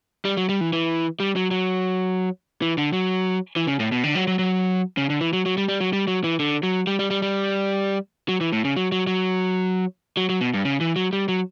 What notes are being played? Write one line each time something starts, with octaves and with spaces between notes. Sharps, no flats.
G3
F#3
G3
E3
E3
G3
F#3
F#3
E3
D3
F#3
E3
C#3
A2
B2
D3
F#3
F#3
F#3
C#3
D3
E3
F#3
F#3
G3
G3
F#3
G3
F#3
E3
D3
F#3
G3
G3
G3
G3
F#3
E3
A2
C#3
F#3
F#3
F#3
F#3
F#3
B2
G2
C#3
E3
F#3
G3
F#3